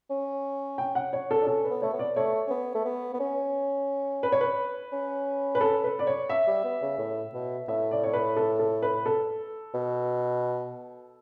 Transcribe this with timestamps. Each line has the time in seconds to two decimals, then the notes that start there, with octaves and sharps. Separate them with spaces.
0.10 C#4
0.78 G5
0.95 F#5
1.13 C#5
1.31 A4
1.41 D4
1.47 C#4 A4
1.64 B4
1.71 B3
1.82 A3 C#5
1.93 B3
1.99 D5
2.16 A3 C#5
2.47 C#4
2.50 B3
2.75 A3
2.85 B3
3.14 B3
3.20 C#4
4.23 B4
4.32 C#5
4.41 B4
4.92 C#4
5.55 B4
5.61 A4
5.84 B4
5.99 D5
6.07 C#5
6.29 E5
6.47 G3
6.64 B3
6.82 C#3
6.99 A2
7.33 B2
7.68 A2 E5
7.91 D5
8.03 C#5
8.13 B4
8.36 A4
8.59 A4
8.82 B4
9.06 A4
9.74 B2